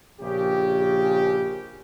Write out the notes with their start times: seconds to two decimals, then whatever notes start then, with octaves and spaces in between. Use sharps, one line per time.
0.21 A#1 C#3 G4